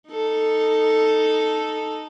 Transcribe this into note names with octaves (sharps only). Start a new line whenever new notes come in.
D#4 A4